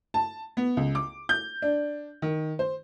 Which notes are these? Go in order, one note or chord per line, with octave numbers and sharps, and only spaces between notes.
A5
B3
C#2
D6
G6
D4
D#3
C5